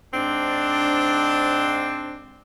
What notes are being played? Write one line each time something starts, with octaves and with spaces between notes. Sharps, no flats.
G#2 C4 D4